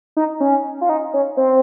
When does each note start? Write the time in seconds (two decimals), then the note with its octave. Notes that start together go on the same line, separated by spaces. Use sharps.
0.17 D#4
0.40 C#4
0.81 F4
0.89 D#4
1.14 C#4
1.37 C4